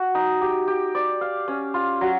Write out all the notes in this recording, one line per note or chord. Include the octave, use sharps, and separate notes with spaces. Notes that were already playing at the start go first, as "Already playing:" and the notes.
Already playing: F#4
D#4
G4
G4
D5
F5
C#4
F4
F#3